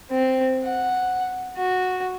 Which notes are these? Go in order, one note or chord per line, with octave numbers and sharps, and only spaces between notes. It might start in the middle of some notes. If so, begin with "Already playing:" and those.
C4
F#5
F#4